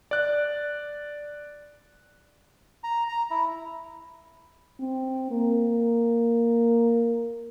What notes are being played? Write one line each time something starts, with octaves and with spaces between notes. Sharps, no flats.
D5 F#6
A#5
A#5
E4
C4
A#3